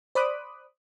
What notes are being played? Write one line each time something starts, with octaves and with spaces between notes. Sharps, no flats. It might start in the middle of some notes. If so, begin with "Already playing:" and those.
C5 D5 B5 D6 D#6 F#6